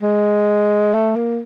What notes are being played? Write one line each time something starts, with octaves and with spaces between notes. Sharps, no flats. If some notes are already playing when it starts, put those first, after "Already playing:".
G#3
A3
A#3